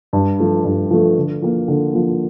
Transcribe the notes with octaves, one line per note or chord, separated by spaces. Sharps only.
G2
F3 A3
G2
F3 A3
D3
F3 A#3
D3
F3 A#3